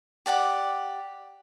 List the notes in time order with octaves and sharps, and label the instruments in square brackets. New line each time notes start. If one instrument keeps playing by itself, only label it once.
[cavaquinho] G4 D5 F#5 D6